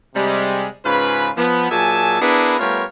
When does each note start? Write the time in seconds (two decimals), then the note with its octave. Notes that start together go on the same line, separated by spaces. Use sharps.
0.14 C3 G3 G#3
0.84 G#2 C#3 C#4 F4 B4
1.36 F3 B3
1.69 A#2 F#3 G#4 E5 G#5 A5
2.20 B3 D4 E4 G#4 A#4 B4
2.59 G3 A3 B3 F4 A#4 C#5